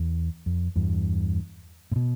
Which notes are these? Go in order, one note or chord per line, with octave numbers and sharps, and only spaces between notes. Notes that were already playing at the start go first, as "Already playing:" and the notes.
Already playing: E2
F2
E2 G2
A2
B2